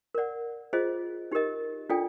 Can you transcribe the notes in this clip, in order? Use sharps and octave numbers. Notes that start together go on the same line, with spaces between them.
A#4 D5 F#5
F4 G#4 C5 D#5
D#4 G4 A#4 D#5
D4 F4 A4 D5 G5